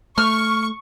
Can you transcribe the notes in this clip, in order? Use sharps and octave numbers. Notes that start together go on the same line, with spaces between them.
A3 C#6 F6